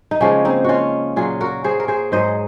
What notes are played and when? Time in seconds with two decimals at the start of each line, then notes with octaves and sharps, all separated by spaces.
0.11 D#4
0.21 C#3 F3 G#3 A#3 C#4
0.45 C4 D#4
0.64 C#4 F4 F#4
1.16 A#2 F#3 F4 G#4
1.41 F#4 A#4
1.64 G#4 C5
1.80 A#4
1.88 G#4 C5
2.12 G#2 F#3 C5 D#5